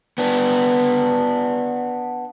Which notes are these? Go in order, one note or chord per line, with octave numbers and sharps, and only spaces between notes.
B3 D4